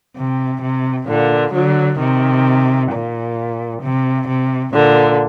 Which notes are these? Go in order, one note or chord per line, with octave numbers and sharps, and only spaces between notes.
C3
C3
A#2 D3
D3 F#3
C3 D#3
A#2
C3
C3
A#2 D3